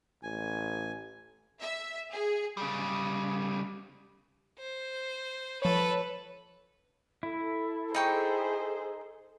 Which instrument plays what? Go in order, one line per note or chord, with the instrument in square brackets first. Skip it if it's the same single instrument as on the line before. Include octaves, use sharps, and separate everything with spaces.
[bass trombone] A1 [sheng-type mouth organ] G#5
[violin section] E5
G#4
[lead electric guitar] C#3 G3
[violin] C5
[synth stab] F3 C#5 [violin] A4 B4
[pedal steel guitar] E4 [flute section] A4
[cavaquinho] D#4 G5 C#6 [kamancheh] G#4 C5